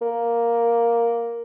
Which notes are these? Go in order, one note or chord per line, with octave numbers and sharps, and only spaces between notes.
A#3